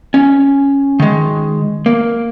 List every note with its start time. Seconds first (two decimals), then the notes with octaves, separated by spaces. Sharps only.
0.14 C#4
1.00 D#3 G#3
1.86 A#3